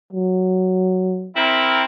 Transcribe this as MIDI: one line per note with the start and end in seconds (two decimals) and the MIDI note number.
0.13 1.29 54
1.37 1.84 60
1.37 1.84 64
1.37 1.84 70